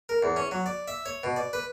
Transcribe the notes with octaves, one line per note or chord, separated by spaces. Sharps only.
A#4
E2
C#4
F#3
D5
E5
C#5
B2
D5
B4